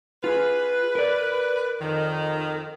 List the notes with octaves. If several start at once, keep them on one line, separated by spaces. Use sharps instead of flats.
F4 G#4 B4
A#4 D5
F2 D#3